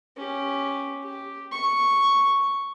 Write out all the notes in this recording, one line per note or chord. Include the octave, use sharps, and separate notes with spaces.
C#4 G4
G4
C#6